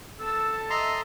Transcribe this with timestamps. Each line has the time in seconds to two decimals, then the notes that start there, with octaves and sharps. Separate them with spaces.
0.20 A4 A5 E6
0.70 D#5 E5 A#5 C6